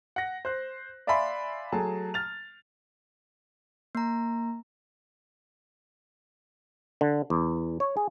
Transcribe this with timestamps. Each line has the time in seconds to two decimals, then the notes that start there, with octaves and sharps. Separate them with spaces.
0.16 F#5 A#6
0.45 C5 F#6
1.07 D5 E5 F5 G#5 B5 C6
1.72 F#3 A3 G#4 A5
2.14 F6 A6 F7
3.95 A#3 A#5
7.01 D3
7.30 E2
7.80 C#5
7.97 G#4